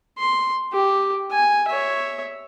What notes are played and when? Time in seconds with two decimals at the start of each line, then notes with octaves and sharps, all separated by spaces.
0.18 C6
0.73 G4
1.31 G#5
1.68 C#5 E5